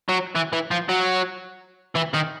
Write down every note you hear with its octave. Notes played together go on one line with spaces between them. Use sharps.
F#3
E3
E3
F3
F#3
E3
D#3